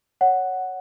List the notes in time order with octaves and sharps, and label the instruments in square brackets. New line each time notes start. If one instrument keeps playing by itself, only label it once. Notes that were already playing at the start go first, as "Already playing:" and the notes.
[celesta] C#5 F#5